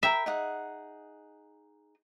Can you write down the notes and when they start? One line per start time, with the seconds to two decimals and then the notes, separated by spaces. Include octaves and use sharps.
0.03 A#4 E5 G5 B5
0.26 D#4 G#4 F#5